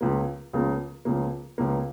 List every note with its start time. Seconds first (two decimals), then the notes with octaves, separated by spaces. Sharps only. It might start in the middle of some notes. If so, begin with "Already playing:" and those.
0.01 C#2 C#3 F3 A#3
0.53 C#2 C#3 F3 A#3
1.05 C#2 C#3 F3 A#3
1.58 C#2 C#3 F3 A#3